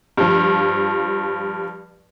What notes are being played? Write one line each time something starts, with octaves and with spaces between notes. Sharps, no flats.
G2 F3